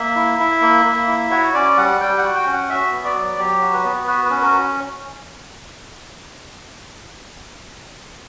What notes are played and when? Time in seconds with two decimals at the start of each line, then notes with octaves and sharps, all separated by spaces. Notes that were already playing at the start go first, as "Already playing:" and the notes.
Already playing: A#3 E5
0.16 E4
0.40 E4
0.62 A#3
0.85 A#3
1.08 E4
1.31 F#4 C#5
1.54 C#4 D5
1.77 G3 F#5
2.00 G3 G5
2.18 F#5
2.23 F#4
2.34 G5
2.46 C#4
2.52 F#5
2.69 F#4 E5
2.92 B3
3.04 D5
3.15 F#3
3.38 F#3 G4
3.61 F#4
3.73 B4
3.85 B3
4.07 F#4 B4
4.25 B4
4.30 C#4
4.42 A#4